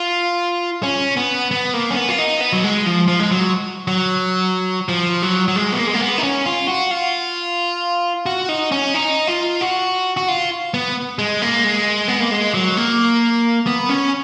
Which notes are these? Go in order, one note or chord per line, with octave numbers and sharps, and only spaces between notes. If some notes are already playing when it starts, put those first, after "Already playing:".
Already playing: F4
C#4
B3
B3
A#3
C#4
B3
F4
D#4
B3
F#3
G#3
F3
F3
G#3
F#3
F#3
F3
F#3
F#3
G#3
B3
A#3
G#3
A#3
B3
D#4
C#4
F4
F#4
F4
F#4
D#4
C#4
D#4
F4
F#4
F#4
F4
B3
G#3
A#3
G#3
B3
A#3
G#3
F#3
A#3
B3
C#4